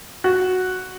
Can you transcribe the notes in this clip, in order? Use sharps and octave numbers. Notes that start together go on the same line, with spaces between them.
F#4